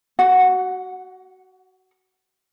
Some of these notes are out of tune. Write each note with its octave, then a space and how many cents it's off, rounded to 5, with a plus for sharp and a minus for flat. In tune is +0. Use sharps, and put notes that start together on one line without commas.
F#4 +20 F#5 -15